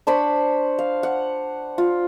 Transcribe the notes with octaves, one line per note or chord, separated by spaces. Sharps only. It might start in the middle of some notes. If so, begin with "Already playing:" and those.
D4 C5 B5 C#6
F5
F#5
F4